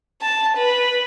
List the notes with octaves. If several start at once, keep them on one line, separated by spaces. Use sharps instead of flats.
A5
B4